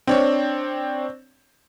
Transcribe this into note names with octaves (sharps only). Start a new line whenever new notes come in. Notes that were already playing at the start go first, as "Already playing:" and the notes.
C4 D4 C#5